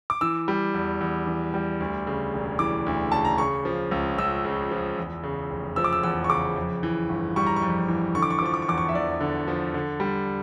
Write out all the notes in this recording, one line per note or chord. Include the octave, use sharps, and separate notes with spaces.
D6
E3 E6
G3
E2
E2
E3
G3
D2
C#3
E1
E3 D6
D2
C#3 A5
A#5
C#3 C#6
F3
C#2
C#2 E6
C#3
F3
E2
C#3
F1
F3 E6
D6
E6
E2 E6
C#6
C#3 D6
F2
E3
G1
G3 C#6
A#5
C#6
F2
E3
D3 C#6
D6
C#6
D6
F3 C#6
D6
C#6
E2 D6
C#6
E5
E2 D5
D3
F3
D3
G3